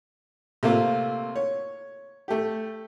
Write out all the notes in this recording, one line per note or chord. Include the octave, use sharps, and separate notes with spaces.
C3 A3 A#3 F4
C#5
A3 G4